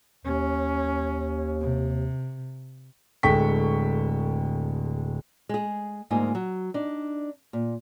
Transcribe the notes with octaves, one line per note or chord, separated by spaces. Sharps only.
D#2 C#4
C3
D1 G#3 A4 G5 C#6 B6
G#3 G#4
D2 G#2 A#3 D#4 F4 G#5
F#3
D4 D#4
A#2